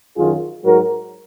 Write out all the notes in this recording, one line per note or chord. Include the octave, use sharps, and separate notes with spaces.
F#2 D#3 F#3 F4 G#4
G#2 F#3 F#4 A#4